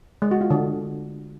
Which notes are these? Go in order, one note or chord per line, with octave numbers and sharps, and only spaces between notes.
G#3
F#4
F4
D3